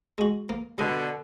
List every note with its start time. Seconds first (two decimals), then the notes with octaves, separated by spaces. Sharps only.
0.18 G#3 F#4
0.49 A#3
0.78 B2 D3 G3 D#5